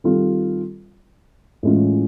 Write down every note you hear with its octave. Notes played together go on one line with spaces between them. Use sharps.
D#3 G3 C4 F4 A4
A2 E3 G#3 C#4 F4